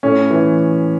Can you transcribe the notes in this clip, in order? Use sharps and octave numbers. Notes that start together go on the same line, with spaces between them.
A2 C#4
E3